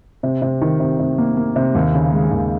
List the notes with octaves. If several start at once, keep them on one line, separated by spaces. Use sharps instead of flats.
C3
C3
D#3
C3
C3
A#3
A#3
C3
D#2
C#3
G#3
D#2